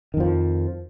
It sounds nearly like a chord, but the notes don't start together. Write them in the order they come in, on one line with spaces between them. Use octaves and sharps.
D#3 F2 F3